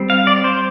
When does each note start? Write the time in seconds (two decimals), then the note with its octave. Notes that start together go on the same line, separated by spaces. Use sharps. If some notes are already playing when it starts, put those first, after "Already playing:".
Already playing: G3 C4
0.10 F5
0.27 D5
0.44 C5